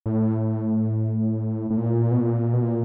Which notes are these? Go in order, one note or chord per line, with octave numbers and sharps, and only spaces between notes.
A2
A2
A#2
B2
A#2
B2
A#2